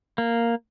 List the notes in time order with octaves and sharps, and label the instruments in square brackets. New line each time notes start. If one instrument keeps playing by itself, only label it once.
[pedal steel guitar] A#3